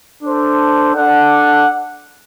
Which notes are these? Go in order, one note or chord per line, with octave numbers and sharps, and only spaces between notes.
D4 A4 C5
D4 A4 D5 F#5